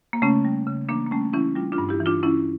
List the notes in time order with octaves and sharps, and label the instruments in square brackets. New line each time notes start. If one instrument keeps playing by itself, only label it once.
[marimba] A#3
C#3 A3 C#4
G3
C#3
E3 A#3 D4
A#3
G3 A3 C#4
E3 C#4 E4
G3 D4 F4
D4 F4
G2
E4 G4
E3
D4 F4
E3 C#4 E4